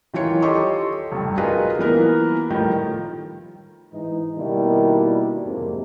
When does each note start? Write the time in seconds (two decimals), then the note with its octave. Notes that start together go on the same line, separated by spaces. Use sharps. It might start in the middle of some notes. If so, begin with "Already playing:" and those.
0.14 D#3 E3 F4 C#5 C#7
0.42 G4 A4 C#5 D#5 C6 C#6
1.12 F1 G2
1.38 D#4 F4 F#4 G#4 A#4 B4
1.79 E3 A#3 B3 A#4
2.50 A2 D#3 F3 G3
3.93 G#2 E3 G#3 D#4
4.37 B2 D#3 G3 A#3 D4 E4
5.45 F2 G#2 C3 F3 F#3 A#3